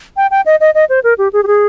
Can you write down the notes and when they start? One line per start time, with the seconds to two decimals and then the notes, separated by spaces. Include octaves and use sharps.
0.17 G5
0.31 G5
0.46 D#5
0.60 D#5
0.75 D#5
0.89 C5
1.04 A#4
1.18 G4
1.33 G#4
1.43 G4
1.47 G#4